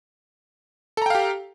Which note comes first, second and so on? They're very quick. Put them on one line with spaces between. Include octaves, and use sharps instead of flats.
A4 A#5 G5 F5 G4